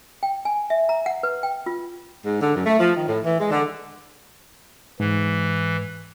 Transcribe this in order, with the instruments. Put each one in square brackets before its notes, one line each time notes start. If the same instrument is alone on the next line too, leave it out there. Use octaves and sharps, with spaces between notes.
[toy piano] G5
G#5
E5
A#5
F#5
B4
G5
F4
[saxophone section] G#2
D3
F#2
A3
F3
D#3
A2
E3
G#3
D3
[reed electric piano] G#2 [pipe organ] E3